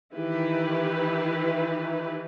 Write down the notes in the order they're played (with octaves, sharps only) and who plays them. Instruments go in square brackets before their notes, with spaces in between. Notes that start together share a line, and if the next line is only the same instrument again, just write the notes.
[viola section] D#3 E3 E4 G4 B4